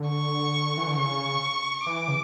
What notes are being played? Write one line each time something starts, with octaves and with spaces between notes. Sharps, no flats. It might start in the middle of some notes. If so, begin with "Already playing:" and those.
Already playing: D3
C#6
E3
D3
C#3 C#6
E3 D6
C#3